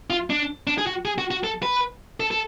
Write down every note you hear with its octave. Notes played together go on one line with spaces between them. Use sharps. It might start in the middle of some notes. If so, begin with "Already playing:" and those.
F4
D4
D4
G#4
F#4
G#4
F#4
F#4
A4
B4
A4
A4